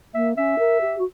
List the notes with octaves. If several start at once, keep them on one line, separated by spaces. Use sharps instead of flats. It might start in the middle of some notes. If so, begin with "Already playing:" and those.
A#3 E5
C#4 E5
A#4
G4
F#4